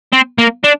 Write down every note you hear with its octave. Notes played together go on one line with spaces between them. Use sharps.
C4
A#3
D4